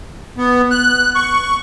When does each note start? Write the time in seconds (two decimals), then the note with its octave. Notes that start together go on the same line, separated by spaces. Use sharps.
0.38 B3
0.71 F#6
1.15 C#6